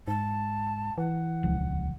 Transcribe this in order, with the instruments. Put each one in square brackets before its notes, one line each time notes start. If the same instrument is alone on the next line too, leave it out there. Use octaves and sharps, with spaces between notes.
[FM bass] G#2 [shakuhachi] A5
[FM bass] E3 [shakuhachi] F#5
[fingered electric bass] D#1 C#2 F3